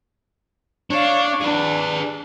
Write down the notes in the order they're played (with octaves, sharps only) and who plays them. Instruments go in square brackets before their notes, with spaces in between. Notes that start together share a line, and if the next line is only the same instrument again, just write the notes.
[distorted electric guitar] D4 [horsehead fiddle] C#5 F5
[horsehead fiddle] D4 [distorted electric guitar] G#4 B4